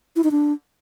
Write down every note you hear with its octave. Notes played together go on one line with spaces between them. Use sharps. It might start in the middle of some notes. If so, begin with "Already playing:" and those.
E4
D#4
D4